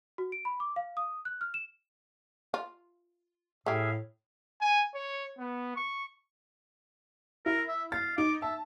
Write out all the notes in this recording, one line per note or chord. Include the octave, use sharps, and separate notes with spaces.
F#4
D7
B5
D6
F5
D#6
F#6
F6
E7
F4
A2 A3 G4 G#4 E5 F5
G#5
C#5
B3
C#6
E4 A#4
E5
F5 A6
D#4 D6
E5 A5